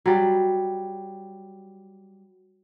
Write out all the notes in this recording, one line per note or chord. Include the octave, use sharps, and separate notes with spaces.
F#3 G3